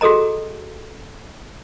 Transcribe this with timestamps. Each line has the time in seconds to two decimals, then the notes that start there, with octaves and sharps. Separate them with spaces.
0.01 F#4 G#4 A4 D#5 A#5